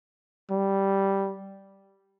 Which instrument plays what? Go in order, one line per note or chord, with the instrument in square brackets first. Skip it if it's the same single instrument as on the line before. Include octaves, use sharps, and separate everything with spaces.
[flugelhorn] G3